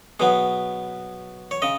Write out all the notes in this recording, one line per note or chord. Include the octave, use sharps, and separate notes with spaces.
B2 F#3 B3 G#4
C#5
C#3 D#5